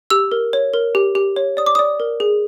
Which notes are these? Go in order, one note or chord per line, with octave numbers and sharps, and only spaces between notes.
G4 E6
A#4
C#5
A#4
G4
G4
C#5
D5 D#6
D6
D5 D#6
A#4
G#4